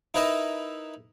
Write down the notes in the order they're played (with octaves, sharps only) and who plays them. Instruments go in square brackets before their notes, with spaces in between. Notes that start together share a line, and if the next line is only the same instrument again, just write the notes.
[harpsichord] D#4 E4 A#4 B4 D#5 E5